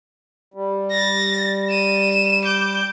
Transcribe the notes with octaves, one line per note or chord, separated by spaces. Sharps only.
G3
A6 A#6
D#7 E7
D6 G6